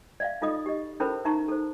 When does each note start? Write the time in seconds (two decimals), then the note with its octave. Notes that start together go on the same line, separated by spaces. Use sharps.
0.20 D5 E5 F5
0.41 D#4 F4 A4 D#5 D#6
0.66 G4 D#5
1.00 C#4 E4 A4 A#4 C5 B5
1.25 D#4 E5 A5 A#5 C#6
1.48 A4 C5